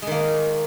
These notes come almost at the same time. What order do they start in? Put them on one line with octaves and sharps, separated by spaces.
G#3 D#3 A#3